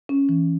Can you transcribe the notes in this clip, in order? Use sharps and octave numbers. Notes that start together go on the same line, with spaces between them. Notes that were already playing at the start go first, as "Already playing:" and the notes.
C#4
E3